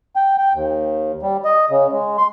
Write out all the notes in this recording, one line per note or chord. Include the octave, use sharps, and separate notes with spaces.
G5
G5
D#2
G3
D#5
C#3
G#3
C6